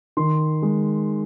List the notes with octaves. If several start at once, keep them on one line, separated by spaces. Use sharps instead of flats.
D#3 C6
G#3